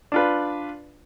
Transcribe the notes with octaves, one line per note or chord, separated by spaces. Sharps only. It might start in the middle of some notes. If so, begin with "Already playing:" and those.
D4 F4 B4